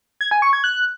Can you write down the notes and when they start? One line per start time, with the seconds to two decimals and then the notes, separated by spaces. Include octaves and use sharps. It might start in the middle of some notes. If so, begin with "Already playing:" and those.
0.21 G#6
0.31 G#5
0.42 C#6
0.53 G#6
0.64 F#6